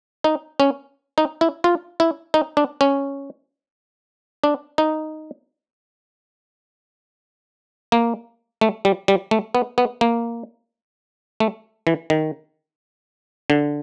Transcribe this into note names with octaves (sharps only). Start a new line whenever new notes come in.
D#4
C#4
D#4
E4
F4
E4
D#4
D4
C#4
D4
D#4
A#3
A3
G3
G3
A3
B3
B3
A#3
A3
E3
D#3
D3